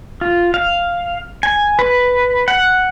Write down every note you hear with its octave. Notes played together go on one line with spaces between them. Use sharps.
F4
F5
G#5
B4
F#5